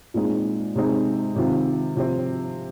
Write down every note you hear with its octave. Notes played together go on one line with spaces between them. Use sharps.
A#2 G#3 C4 D#4
C3 G#3 C4 D#4
C3 D#3 C4 F4
C3 F3 C4